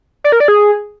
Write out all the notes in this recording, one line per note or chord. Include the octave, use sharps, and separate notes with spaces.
D5
A#4
D5
G#4